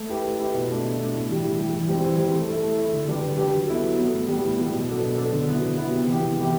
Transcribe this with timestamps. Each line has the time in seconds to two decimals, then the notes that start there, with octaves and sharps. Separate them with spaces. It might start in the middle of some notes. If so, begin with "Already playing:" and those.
Already playing: A3
0.09 E4 G4 B4
0.25 A3
0.39 E4 G4 B4
0.54 B2
0.69 A3 D4
0.84 B2
0.99 A3 D4
1.15 A2
1.29 E3 G3
1.44 A2
1.59 E3 G3
1.74 E3
1.88 G3 C4
2.03 E3
2.18 G3 C4
2.34 A3
2.48 E4 A4
2.63 A3
2.78 E4 A4
2.93 D3
3.08 G3 D4 G4 B4
3.23 D3
3.38 G3 D4 G4 B4
3.53 F#3
3.68 B3 E4 A4
3.83 F#3
3.98 B3 E4 A4
4.13 A2
4.28 G3 B3
4.42 A2
4.58 G3 B3
4.73 B2
4.88 F#3 B3 D4 A4
5.03 B2
5.17 F#3 B3 D4 A4
5.33 D3
5.47 F#3 B3 E4
5.62 D3
5.77 F#3 B3 E4
5.92 C3
6.07 E3 B3 E4 G4
6.22 C3
6.38 E3 B3 E4 G4